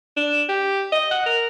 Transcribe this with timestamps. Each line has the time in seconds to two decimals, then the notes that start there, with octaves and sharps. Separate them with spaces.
0.16 D4
0.49 G4
0.92 D#5
1.11 F#5
1.26 A#4